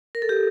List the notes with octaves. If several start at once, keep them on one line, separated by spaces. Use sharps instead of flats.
A#4
A4
G4